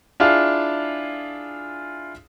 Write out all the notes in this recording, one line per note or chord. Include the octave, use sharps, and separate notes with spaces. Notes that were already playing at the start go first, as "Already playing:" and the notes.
D4 E4 F4 G#4 F5